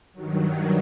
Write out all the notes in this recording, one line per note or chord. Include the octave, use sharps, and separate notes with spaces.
G2 D#3 F#3